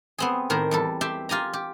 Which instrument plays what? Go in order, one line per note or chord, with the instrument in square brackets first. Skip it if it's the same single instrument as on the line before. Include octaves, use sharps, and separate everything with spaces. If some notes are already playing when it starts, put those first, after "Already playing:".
[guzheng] B3 C4 G#4
A2 D#3 A#4 C5
E2 G3 A4
G4 E5 G5 C6
F4 G4 G#5 A#5
G4